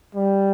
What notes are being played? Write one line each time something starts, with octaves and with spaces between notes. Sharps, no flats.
G3